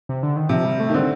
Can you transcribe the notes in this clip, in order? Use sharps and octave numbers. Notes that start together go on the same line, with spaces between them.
C3
D3
D#3
C3 F3
G3
A3
D#3
D3 C4